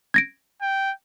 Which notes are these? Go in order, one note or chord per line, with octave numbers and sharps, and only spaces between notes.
G#6 A#6 D7
G5